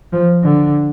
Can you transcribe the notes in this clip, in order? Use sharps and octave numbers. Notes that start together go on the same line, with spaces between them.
F3
D3